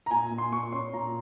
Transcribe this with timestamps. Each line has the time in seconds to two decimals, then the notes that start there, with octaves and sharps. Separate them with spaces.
0.06 A#5
0.10 A#2 G#5
0.31 A#2
0.38 C6
0.52 A#2 C#6
0.72 C#4 C6
0.93 A#2 A#5